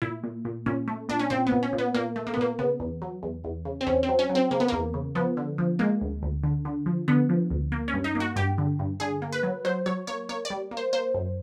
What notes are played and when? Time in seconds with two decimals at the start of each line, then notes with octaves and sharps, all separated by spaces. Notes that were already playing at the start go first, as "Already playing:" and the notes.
0.02 A#2 E4
0.24 A#2
0.45 A#2
0.66 A#2 C#4
0.88 A3
1.09 A#2 D4
1.19 C#4
1.30 A#2 C4
1.47 B3
1.52 A#2
1.63 C#4
1.73 A#2
1.78 B3
1.94 A#2 A#3
2.16 A3
2.27 A#3
2.34 B3
2.37 A#2 A#3
2.59 C#3 B3
2.80 E2
3.02 F#3
3.23 E2
3.44 E2
3.65 C#3
3.81 C4
3.87 E2 C#4
4.03 C4
4.08 F#3
4.19 C#4
4.29 F#3
4.35 C4
4.51 C#3 A#3
4.60 B3
4.68 E2 A#3
4.94 C#3
5.15 F3 B3
5.37 D3
5.58 F3
5.79 G#3 A#3
6.01 D2
6.23 D2
6.43 D3
6.65 D3
6.86 F3
7.08 D3 B3
7.29 F3
7.50 D2
7.72 A#3
7.88 C#4
7.93 G2
8.04 D#4
8.15 A#3
8.20 F#4
8.36 G2 G4
8.58 D3
8.79 G2
9.00 D3 G#4
9.22 A#3
9.32 B4
9.43 F#3
9.65 F#3 C5
9.86 F#3 C#5
10.07 A#3 C#5
10.29 A#3 C#5
10.45 D5
10.50 G3
10.71 A#3
10.77 C5
10.93 A#3 C5
11.14 F#2